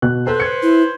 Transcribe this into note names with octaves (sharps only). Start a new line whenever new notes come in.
B2 F#6
A4 B4 C5
G#6 C#7
E4